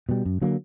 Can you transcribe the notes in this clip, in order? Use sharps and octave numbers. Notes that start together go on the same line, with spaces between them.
B2 G3
F#2
D3 F#3 A#3